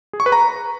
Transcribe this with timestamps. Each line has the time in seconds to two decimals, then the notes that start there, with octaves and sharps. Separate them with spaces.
0.13 G#4
0.20 C#6
0.26 B4
0.32 A#5